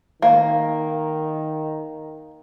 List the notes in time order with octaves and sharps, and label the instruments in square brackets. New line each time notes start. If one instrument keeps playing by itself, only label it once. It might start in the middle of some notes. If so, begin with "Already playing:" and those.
[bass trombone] D#3 [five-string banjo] A#3